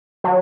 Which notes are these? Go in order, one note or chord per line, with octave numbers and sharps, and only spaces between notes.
F#3